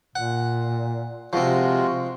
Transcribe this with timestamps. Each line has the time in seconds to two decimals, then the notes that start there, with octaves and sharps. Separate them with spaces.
0.16 A#2 F#5
1.33 C3 F3 G#3 C4 F4 F#4